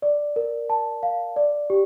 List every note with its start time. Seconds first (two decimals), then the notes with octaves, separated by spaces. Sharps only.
0.02 D5
0.36 A#4
0.70 A5
1.03 F5
1.36 D5
1.70 G4